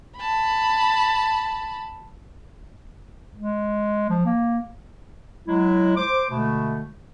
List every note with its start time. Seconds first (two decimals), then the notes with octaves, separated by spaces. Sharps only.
0.17 A5 B5
3.36 G#3
4.10 F3
4.26 A#3
5.47 F#3 G#3 E4
5.96 C5 D6
6.31 B2 D3 G#3 A3